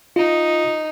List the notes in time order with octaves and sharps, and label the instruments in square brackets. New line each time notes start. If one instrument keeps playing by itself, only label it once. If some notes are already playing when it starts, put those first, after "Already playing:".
[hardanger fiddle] D#4 [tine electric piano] F4